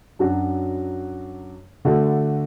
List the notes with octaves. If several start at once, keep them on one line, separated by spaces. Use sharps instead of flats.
F#2 F#3 D4 F#4
D3 A3 D4 F#4